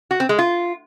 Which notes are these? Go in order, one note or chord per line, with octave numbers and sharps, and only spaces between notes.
F#4
C4
G#3
F4